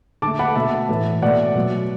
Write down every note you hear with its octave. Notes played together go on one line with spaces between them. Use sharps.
D3 A3 A5 D6
F#5 B5
B2 A3 E5 A5
A2 E3 A3
B2 A3 D5 F#5
B2 F#3 A3